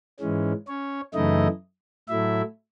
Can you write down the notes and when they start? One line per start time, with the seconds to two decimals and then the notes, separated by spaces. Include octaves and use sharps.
0.20 G#2 E3 G#3 C#4
0.68 C#4 C#5
1.14 F#2 C#3 E3 A3 D#4 E4 D#5
2.09 A2 F#3 A3 E4 E5